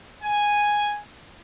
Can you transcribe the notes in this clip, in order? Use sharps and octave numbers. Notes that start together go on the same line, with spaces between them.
G#5